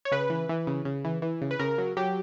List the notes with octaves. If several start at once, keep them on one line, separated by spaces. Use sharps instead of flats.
C#5
C#3 B4
E3
E3
C#3
C#3
E3
E3
C#3
B4
C#3 A#4
F#3
F#3 G4